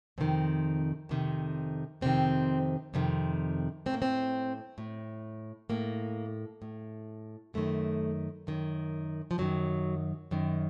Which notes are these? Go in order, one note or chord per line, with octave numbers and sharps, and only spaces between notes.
F2 C3 D#3 C4
F2 C3 D#3
F2 C3 D#3 C4
F2 C3 D#3
A2 C4
A#3
C4
A2
A2 A#3
A2
F#2 D#3 A3
F#2 D#3
F3
F#2 D#3 F#3
F#2 D#3